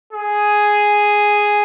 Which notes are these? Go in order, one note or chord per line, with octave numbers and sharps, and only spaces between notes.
G#4